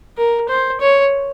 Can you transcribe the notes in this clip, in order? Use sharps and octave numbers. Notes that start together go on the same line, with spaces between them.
A#4
C5
C#5